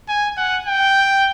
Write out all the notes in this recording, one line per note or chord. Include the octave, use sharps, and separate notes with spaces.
G#5
F#5
G5